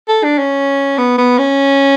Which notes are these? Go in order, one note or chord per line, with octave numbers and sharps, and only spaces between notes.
A4
D4
C#4
B3
B3
C#4